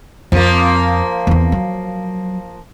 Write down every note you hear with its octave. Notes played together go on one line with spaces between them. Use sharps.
F2 F3 A#3 C4
E2 C4
F#3